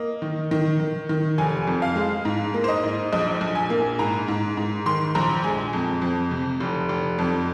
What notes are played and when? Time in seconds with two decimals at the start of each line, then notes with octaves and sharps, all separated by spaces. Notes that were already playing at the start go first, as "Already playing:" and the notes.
Already playing: A#3 D#5
0.22 D#3
0.51 D#3
0.80 D#3
1.09 D#3
1.38 F1 G#5
1.67 F2
1.82 F5
1.96 G#3
2.25 G#2
2.54 A#3
2.64 C5
2.68 D#5
2.84 G#2
3.12 A#1 D#5
3.41 A#1
3.55 G#5
3.70 A#3
3.99 G#2 A#5
4.28 G#2
4.57 G#2
4.86 D#3 C6
5.15 A#1 A#5
5.44 G#3 G#5
5.73 F2
6.02 F2
6.31 C3
6.60 F1
6.89 F1
7.19 F2